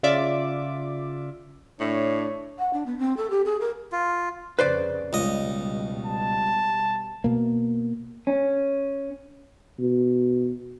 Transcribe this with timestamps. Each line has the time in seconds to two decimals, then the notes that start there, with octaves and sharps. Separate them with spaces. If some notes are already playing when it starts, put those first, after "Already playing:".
0.03 C#3 F4 D5 E5 D6
1.80 A2 D4 C#5
2.59 F#5
2.73 D4
2.86 B3
2.98 C4
3.17 A4
3.30 G4
3.45 G#4
3.60 A#4
3.92 F4
4.59 F2 C#3 B4 C5 D5
5.13 C#2 B2 G3 D#5
6.06 A5
7.24 B2 A#3
8.27 C#4
9.79 B2